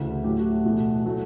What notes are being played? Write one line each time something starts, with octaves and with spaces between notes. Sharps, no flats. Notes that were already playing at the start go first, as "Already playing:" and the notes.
Already playing: D2 C#3 E3
A2 F#3 A3 G4
F#4
F#4
E2 B2 A3
F#3 A3